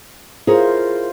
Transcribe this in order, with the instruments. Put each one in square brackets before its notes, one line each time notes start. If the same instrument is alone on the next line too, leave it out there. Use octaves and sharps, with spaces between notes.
[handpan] E4 F4 C5 [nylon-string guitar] G#4 A#4 C#5